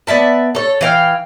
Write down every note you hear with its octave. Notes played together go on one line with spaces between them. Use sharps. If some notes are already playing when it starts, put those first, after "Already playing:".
B3 D5 E5 A5
A4 C#5
E3 F5 G5